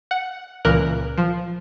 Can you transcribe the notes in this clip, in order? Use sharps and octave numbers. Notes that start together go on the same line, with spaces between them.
F#5
C#2 A#2 E3 A#4 F#6
F3